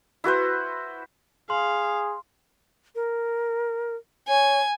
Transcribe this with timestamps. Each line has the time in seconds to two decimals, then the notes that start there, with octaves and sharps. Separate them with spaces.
0.24 E4 F#4 B4 C5
1.50 G#4 F5 C6
2.95 A#4
4.28 C#5 G#5